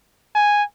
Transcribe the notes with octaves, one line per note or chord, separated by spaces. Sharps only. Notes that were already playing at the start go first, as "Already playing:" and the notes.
G#5